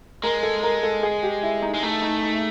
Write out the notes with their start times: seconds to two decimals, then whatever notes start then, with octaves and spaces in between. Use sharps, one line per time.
0.23 G#3 A#4
0.43 A4
0.63 A#4
0.83 A4
1.03 G#4
1.23 G4
1.43 E4
1.62 D#4
1.74 G#3
1.83 A3 D#4
2.02 D#4
2.22 D#4